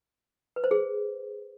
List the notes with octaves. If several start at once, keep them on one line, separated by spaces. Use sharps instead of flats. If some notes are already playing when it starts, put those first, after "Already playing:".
B4
C5
G#4